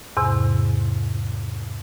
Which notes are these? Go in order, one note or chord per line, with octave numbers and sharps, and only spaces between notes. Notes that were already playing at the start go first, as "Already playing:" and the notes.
E2 G#2 C3